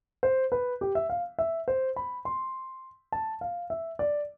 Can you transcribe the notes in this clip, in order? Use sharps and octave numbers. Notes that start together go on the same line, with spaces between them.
C5
B4
G4
E5
F5
E5
C5
B5
C6
A5
F5
E5
D5